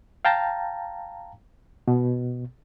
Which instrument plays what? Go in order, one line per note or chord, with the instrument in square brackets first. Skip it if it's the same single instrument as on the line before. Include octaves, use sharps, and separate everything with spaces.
[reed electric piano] F5 G5 A5 A#5
B2